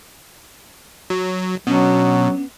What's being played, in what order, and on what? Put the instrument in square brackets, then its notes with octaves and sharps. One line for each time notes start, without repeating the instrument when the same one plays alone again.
[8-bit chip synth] F#3
[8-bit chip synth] B2 [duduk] F#3 [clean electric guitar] B3 C#4 D4